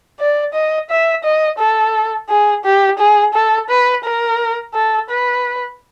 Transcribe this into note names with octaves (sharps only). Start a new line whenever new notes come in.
D5
D#5
E5
D#5
A4
G#4
G4
G#4
A4
B4
A#4
A4
B4